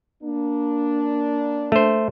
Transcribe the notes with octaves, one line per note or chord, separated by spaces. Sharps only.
A#3 D4
A3 C5